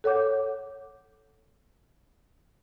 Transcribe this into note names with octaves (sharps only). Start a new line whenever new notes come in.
A4 C#5 F#5 D6 G6